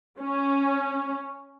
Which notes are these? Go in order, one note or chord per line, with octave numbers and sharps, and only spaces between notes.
C#4